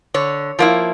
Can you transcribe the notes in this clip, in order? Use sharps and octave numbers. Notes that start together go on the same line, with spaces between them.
D3 C#5
F3 A#3 E4